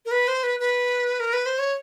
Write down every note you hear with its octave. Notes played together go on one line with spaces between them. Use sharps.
A#4
B4
C5
B4
B4
A#4
B4
C5
C#5